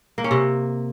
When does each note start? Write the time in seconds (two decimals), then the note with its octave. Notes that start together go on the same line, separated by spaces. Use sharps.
0.18 A#3
0.24 C#4
0.31 C3